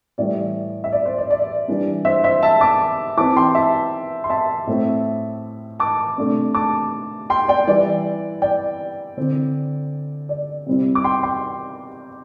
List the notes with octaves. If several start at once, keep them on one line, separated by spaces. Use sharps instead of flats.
A2 E3 G3 D5
E5
D5
C5
D5
D5
E3 G3 D4
C5 E5
C5 E5
E5 A5
A5 D6
E3 C4 E4 A5 D6
G5 C6
E5 A5
C6
E5 A5
A2 A3 C4 E4
A5 D6
C3 A3 D4
A5 D6
G5 C6
D5 G5
E3 G3 E4 D5
D5 G5
D3 C4 E4
D5
C3 G3 C4 E4
D6
G5 C6
G5 C6